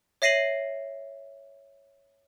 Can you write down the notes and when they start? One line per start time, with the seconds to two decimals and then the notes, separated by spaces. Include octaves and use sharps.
0.22 C#5 E5 A#6 C7 D#7 F#7